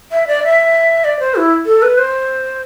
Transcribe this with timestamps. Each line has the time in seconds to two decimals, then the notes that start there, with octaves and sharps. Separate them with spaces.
0.12 E5
0.27 D5
0.43 E5
1.04 D5
1.19 C5
1.36 E4
1.66 A4
1.82 B4
1.98 C5